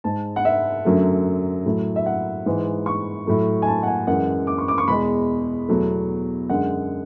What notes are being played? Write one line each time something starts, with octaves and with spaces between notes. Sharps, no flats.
G#2 G#3 A5
F#5
E5
F#2 D3 F#3 A3
A2 F#3 A3
E5
F#5
G#2 E3 G#3
C#6
A2 F#3 A3
G#5
A5
F#5
G#5
F#2 E3 G#3 F#5
D6
C#6
D6
C#6
E2 B2 G#3 B5
E2 B2 F#3 A3
F#2 D3 G#3 F#5